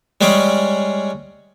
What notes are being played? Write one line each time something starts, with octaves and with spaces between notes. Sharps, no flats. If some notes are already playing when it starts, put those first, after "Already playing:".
G3 G#3 C#4 G#4 G5